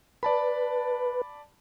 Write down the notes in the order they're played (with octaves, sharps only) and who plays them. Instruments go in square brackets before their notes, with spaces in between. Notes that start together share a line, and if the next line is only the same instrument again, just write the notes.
[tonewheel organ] B4 [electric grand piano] D5 A5 B5